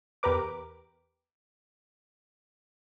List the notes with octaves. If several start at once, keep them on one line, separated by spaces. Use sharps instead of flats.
E2 G4 A#4 B4 D6